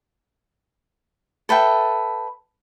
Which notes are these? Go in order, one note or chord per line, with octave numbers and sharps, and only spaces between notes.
A4 B4 E5 G5